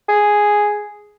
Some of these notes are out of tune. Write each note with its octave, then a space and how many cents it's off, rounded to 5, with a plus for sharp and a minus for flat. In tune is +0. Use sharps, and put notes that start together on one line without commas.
G#4 +0